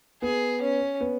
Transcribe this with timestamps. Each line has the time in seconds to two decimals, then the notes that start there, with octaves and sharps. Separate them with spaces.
0.22 B3 G#4
0.61 C#4
1.00 B3